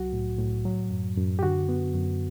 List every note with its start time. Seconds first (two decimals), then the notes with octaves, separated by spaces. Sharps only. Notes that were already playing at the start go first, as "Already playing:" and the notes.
Already playing: C2 F#3 F#4
0.13 A2
0.39 A2
0.65 F#3
0.90 F#2
1.17 F#2
1.39 G4
1.43 D3 F#4
1.69 B3
1.94 F#2